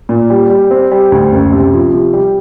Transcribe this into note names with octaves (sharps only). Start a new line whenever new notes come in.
A#2
G3
G3
C4
G3
D2
F#1
C3
F3
C3
G3